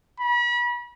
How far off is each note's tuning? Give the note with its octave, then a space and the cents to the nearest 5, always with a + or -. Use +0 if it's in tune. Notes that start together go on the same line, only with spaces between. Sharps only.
B5 -35